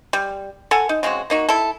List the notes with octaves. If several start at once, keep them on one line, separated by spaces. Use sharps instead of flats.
G3
A4 F#5 G#5
D#4
C#3 G#3 C4 F#4
A#3 D#4 F#4
E4 A4